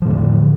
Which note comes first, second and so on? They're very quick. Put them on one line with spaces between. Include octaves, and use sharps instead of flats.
F3 A2 D3